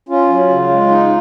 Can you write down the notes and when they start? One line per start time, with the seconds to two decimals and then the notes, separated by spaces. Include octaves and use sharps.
0.09 C#4 F4
0.29 F#3
0.49 C#3
0.69 G#3
0.89 D#4